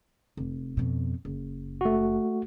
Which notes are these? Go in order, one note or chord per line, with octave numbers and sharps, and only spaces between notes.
F1
F2 B2
F#1
A3 F#4